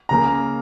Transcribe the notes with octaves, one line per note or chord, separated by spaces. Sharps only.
C#3 A#3 A#5